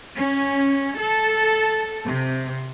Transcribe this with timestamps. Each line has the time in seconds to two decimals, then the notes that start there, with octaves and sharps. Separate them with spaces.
0.15 C#4
0.99 A4
2.04 C3